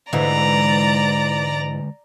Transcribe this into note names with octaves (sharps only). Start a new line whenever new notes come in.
G#2 D3 E3 G#3 D5 A#5